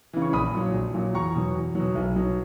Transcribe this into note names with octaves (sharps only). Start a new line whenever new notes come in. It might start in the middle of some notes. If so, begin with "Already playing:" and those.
C#3 E3
C#6
A#1 B5 D#6
A#2 F#3
A#1
A#2 F#3
E2 A#5 C#6
B2 F#3
E2
B2 F#3
B1
B2 F#3